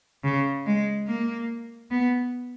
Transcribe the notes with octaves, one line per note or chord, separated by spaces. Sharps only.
C#3
G#3
A#3
B3